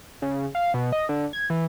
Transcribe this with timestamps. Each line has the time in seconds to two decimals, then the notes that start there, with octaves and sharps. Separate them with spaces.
0.22 C#3
0.55 F5
0.74 B2
0.92 D#5
1.09 D3
1.33 G#6
1.50 E3